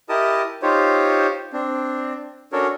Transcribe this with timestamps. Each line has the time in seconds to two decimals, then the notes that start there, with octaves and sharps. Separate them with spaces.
0.09 E4 G4 A#4 D#5 A5 D#6
0.62 D#4 F4 G4 C5 C#5
1.53 C4 D4
2.52 C#4 D4 F#4 A4 A#4 C#5